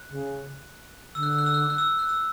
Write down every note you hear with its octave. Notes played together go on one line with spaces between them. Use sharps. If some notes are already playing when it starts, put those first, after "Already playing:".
Already playing: F#6
C#3
D3 E6
F#6
E6
F#6
E6
F#6
E6
F#6
E6
F#6
E6